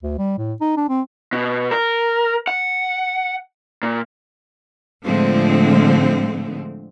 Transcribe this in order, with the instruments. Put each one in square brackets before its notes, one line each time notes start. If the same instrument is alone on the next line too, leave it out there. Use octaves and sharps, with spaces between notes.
[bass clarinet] D2
G3
A2
D#4
D4
C4
[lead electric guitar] B2
A#4
F#5
A#2
[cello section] A2 D3 F3 G#3 A3 C4